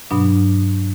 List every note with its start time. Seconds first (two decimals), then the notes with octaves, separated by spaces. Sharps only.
0.11 G2 B2 F#3 D4